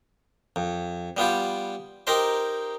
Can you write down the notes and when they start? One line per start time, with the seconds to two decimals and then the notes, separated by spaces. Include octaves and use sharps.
0.56 F2
1.17 G3 B3 F4 G4
2.07 D#4 G4 A#4 C5 C6